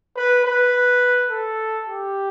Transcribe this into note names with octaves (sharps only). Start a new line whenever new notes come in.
B4
B4
A4
G4